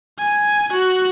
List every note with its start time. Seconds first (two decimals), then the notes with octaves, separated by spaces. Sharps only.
0.19 G#5
0.73 F#4